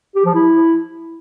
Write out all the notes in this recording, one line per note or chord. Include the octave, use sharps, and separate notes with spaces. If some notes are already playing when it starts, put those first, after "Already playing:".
G4
F3
E4